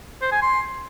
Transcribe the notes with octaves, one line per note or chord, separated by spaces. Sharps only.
C5
G#5
C6